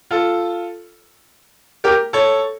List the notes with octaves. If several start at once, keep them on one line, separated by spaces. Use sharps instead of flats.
F4 A4
G4 A#4
A4 C#5